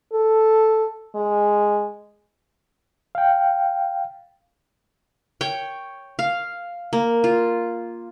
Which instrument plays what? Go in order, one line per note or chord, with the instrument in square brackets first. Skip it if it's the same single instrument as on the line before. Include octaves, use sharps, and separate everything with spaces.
[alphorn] A4
G#3
[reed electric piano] F5 G5
[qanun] C#5 G5
F5
A#3
F4